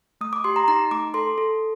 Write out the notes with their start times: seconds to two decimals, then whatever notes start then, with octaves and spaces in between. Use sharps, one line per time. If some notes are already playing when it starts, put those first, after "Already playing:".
0.21 A3 D#6
0.33 D6
0.44 G4 C6
0.56 A#5
0.68 D#4 A#5
0.91 A3 D6
1.14 A4 C6
1.38 A4